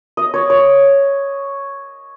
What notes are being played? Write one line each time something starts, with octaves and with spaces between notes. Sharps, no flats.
D#5
C#5
C#5